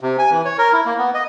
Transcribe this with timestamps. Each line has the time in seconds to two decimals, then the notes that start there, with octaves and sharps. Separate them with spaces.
0.01 C3
0.19 G#5
0.31 E3
0.45 C#5
0.58 A#4
0.73 E4
0.85 A#3
0.98 B3
1.14 D#5